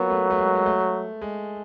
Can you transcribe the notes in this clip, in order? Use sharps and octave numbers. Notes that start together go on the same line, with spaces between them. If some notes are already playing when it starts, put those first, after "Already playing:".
Already playing: F#3 A#3 B3 F4
A3
A3
G#3
G#3
A3
G#3